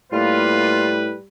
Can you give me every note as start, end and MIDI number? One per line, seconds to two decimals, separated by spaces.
0.12 1.13 45
0.12 1.28 55
0.12 0.93 58
0.12 0.93 65
0.12 1.17 71